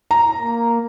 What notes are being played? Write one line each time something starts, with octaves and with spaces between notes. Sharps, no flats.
A#5
A#3